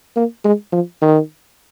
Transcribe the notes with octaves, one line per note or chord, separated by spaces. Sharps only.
A#3
G#3
F3
D#3